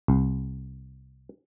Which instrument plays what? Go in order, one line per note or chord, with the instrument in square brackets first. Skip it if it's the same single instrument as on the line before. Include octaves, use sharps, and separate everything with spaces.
[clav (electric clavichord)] C2